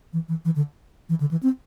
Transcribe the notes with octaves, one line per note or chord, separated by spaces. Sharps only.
E3
E3
E3
D3
E3
D3
E3
C4